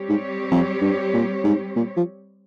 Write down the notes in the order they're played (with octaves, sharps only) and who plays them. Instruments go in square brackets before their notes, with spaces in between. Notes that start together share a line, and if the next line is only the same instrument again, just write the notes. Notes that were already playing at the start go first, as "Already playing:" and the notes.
Already playing: [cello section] G3 C4 G4 C#5
[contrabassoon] G#2
F2
G2
A#2
G#2
A#2
F3